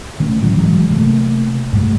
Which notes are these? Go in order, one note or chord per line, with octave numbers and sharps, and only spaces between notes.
D#3 A3 C#4
A2 D3 E3 F#3
E3 F#3 G#3
C3 A3 A#3
G#2 G3 A3